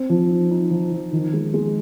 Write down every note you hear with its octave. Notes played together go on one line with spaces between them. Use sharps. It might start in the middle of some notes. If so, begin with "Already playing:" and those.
Already playing: C4
F3
D#4
D#4
F3
F3
D#3
G#3
G#3